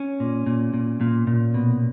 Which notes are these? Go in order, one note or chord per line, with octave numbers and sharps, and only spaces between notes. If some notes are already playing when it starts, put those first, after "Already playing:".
Already playing: C#4
A#2
A#2
A#2
A#2
A#2
B2